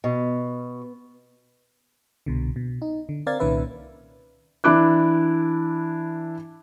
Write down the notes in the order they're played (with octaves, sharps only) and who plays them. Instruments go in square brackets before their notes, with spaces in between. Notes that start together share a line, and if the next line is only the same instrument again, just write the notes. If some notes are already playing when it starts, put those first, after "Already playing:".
[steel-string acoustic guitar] B2
[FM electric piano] C2 B2 D3
B2
D#4
D3
C4 A#4 D5 F5 G#6 A6
C2 A#2 D#3 C#4 B4 E5
[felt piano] E3 D4 E4 D6 F#6